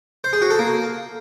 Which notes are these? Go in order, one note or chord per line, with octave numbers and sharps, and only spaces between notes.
C5
G#4
F#4
A4
A#3